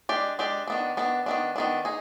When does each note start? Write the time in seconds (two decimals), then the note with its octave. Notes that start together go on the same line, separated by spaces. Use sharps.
0.09 G#3 D4 G4 D5
0.39 G#3 D4 G4 D5
0.68 D#3 B3 D4
0.97 D#3 B3 D4
1.26 D#3 B3 D4
1.56 D#3 B3 D4
1.85 D#4 G#4